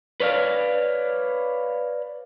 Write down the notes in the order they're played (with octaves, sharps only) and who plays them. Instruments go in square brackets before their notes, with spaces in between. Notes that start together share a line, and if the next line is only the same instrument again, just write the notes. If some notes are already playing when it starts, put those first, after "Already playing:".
[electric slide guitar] B4 C#5 D5 F5